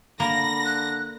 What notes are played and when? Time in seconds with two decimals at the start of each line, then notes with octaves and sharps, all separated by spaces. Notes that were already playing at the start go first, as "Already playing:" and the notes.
0.20 D3 A#3 B5 A#6
0.65 F#6